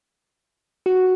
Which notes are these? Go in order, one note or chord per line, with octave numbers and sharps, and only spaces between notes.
F#4